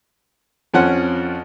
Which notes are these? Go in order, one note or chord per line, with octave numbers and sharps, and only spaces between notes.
F2 F3 C#4 F#5